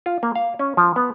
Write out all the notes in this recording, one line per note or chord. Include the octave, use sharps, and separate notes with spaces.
F4
A#3
F5
C#4
F3
B3